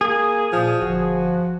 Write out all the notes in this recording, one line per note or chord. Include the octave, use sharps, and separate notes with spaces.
A#3 G#4
A#2 F3
G1 F3 F#4